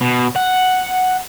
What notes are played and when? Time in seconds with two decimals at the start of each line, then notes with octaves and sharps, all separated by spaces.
0.01 B2
0.36 F#5